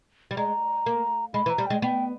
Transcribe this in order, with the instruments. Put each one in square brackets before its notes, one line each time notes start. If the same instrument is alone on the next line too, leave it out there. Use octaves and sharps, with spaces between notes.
[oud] G3
[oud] G#3 [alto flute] A#5
[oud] A#3
[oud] G#3 [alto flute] B5
[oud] E3
[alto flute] A#5
[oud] G3
[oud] G#3 [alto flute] G5
[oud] B3 [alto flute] G5